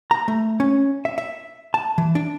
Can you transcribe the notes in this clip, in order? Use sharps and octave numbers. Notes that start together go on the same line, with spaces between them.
A#5
A3
C#4
E5
E5
A5
E3
D4